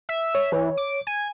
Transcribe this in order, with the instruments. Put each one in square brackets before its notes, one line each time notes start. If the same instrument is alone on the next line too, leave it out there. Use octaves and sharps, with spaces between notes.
[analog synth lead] E5
[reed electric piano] C#5
[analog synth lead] E3
D6
G#5